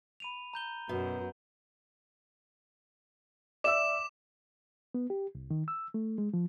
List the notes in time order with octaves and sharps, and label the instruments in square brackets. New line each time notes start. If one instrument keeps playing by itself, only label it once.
[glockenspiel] B5 D#7 F7
A#5 G6 G7
[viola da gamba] F#2 [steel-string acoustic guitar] B2
[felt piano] D5 E5 E6 [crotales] D6 E7
[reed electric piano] B3
G4
C2
D#3
E6
A3
G#3
F3